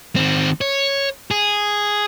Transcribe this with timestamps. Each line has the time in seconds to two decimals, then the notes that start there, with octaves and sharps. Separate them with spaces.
0.16 D#3 C4
0.61 C#5
1.31 G#4